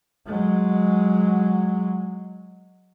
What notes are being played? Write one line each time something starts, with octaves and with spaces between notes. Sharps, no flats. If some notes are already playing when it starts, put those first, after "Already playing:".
F#3 G#3